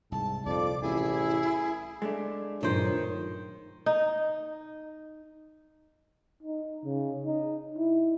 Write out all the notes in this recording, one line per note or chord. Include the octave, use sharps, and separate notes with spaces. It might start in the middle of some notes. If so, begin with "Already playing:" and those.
C2 G#2 A5
C2 F2 A#2 D5 D6
A1 E4 G#4
G#3 A3 D4
G2 A#2 D#3 F#3 C5
D#4
D#4
C#3
D#4
E4